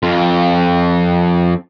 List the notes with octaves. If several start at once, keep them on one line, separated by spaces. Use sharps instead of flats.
F2 F4